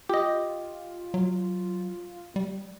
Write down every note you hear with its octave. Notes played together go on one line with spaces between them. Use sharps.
F4 G4 D#5
F#3
G3